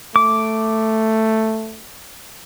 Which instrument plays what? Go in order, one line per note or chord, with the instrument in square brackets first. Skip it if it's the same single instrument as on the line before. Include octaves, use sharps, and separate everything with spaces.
[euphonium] A3 [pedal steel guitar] D6